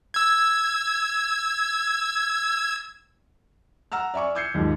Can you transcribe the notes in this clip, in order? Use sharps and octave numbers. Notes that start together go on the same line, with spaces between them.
E6 G#6
F#5 A#5 E6 F6
D5 E5 G#5 C#6 D6
D6 E6 G6 G#6 C7 C#7
D#2 G#2 F3